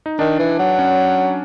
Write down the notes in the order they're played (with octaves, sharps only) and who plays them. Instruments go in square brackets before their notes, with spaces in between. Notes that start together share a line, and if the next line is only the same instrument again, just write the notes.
[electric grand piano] D#4
[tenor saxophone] D#3 [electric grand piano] D4
[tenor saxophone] E3
F#3
[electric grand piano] C#4